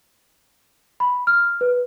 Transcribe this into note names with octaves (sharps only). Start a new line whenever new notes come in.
B5
F6
B4